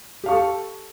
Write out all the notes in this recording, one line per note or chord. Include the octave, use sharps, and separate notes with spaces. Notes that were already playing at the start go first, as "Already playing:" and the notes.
G4 A4 F5 C#6